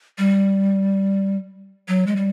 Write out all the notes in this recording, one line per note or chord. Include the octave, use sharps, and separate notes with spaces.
G3
F#3
G#3
G3